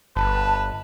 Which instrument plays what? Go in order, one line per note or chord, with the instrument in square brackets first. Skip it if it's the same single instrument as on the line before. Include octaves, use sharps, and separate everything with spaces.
[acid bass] G1 [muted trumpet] B4 [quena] A5